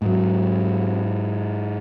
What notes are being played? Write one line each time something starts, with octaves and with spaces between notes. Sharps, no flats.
G#2 F#3